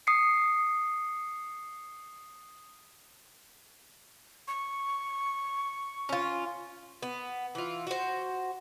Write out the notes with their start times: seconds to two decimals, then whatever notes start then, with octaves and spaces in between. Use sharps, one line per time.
0.07 D#6 C7 C#7
4.48 C#6
6.09 C#4 F4
7.03 B3
7.55 E3 F4
7.87 F#4 C5